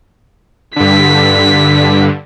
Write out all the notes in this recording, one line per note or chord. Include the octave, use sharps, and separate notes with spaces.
G2 D3 B6